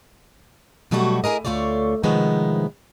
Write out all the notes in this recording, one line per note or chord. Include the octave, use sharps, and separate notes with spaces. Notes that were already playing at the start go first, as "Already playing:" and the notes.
B2 F#3 G3 A3 B3 F#4
E4 G#4 A#4 D#5
D2 C#3 A3 F4 C#5 D5
A2 C3 D#3 F3 G#3 B3